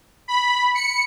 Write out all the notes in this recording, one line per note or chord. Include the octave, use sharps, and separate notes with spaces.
B5
C#7